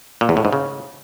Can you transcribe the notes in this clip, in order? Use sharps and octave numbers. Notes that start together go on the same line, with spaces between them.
A#2
E2
A2
G#2
C#3